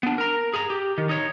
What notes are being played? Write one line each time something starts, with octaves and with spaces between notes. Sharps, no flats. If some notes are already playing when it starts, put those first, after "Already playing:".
B3 D4
A#4 A#5
G#4 A#5
G4
D#3
D#4 C#5